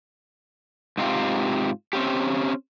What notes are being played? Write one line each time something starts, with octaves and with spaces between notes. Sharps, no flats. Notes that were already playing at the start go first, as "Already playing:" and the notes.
G#2 C3 C4 C#4 F4 G4
C4 C#4 G4